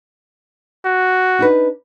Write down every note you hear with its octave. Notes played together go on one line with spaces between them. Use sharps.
F#4
D4 D#4 B4